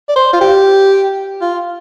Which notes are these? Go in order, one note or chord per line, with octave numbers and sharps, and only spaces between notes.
D5
C5
F4
G4
F4